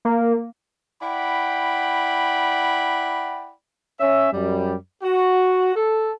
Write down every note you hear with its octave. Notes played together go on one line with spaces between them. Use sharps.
A#3
E4 D5 F#5 G5 B5
C#4 C#5 E5
F#2 G3
F#4
A4